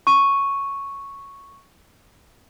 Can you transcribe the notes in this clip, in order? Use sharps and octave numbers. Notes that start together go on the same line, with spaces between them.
C#6 D#7